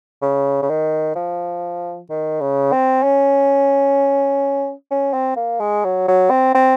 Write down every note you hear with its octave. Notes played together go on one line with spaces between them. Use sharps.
C#3
C#3
D#3
F3
D#3
C#3
C4
C#4
C#4
C4
A#3
G#3
F#3
F#3
C4
C4